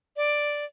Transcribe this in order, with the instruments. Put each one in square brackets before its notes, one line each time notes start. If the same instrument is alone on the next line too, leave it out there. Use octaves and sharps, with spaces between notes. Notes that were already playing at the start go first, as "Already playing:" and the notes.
[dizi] D5